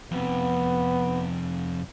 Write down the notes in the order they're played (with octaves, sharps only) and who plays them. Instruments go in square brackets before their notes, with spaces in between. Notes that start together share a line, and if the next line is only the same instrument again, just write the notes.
[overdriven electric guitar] F2 C3 [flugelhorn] B3